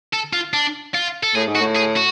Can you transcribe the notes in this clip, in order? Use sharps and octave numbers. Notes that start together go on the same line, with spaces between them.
A4
F4
D4
F4
A4
A2 G#4
G#2
F#4
A2
G#4
F#4